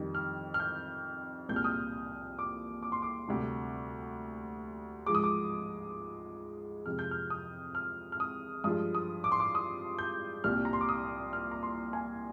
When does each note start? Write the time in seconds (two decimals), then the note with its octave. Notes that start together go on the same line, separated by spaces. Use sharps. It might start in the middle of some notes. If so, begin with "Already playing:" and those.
Already playing: F2 D#3 G3
0.15 F6
0.54 F6
0.60 G6
1.49 C2 A#2 G#3 G6
1.56 F6
1.64 D#6
1.72 F6
2.39 D6
2.83 D6
2.92 C6
3.02 D6
3.28 D2 C3 G3
5.06 G#2 F3 G#3 D6
5.15 D#6
5.24 D6
6.86 F2 C3 F3 G#3 F6
6.99 G6
7.11 F6
7.30 D#6
7.75 F6
8.12 F6
8.20 D#6
8.64 G2 F3 G#3 D#6
8.95 D#6
9.24 D6
9.32 C6
9.40 D6
9.55 D#6
9.99 G6
10.44 C2 A#2 G3 F6
10.65 A#5
10.73 C6
10.81 D6
10.89 D#6
11.33 F6
11.51 A#5
11.63 C6
11.93 G#5